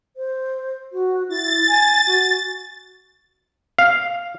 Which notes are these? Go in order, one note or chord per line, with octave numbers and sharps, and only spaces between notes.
C5
F#4
E4 A6
G#5
F#4
F5